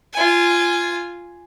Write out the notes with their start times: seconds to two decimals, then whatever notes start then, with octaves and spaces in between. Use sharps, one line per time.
0.13 F4 G#5